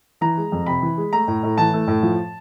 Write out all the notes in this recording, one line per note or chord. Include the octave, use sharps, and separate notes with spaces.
E3 A#5
G#3
F2
C3 B5
E3
G#3
A3 A#5
A2
A2
E3 A5
A3
A2
F3